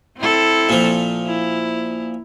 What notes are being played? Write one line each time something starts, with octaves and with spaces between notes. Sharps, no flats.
C4 E4 A4
A#2 F3
E4